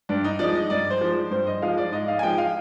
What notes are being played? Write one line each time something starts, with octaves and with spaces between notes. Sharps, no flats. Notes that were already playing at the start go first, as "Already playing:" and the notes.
G2 D4
D#4
F3 G#3 D5
D#5
G2 D5
C5
F3 G#3
G2 C5
D#5
F3 G#3 F5
D5
G#2 D#5
F5
G#5
F3 G#3 G5
F5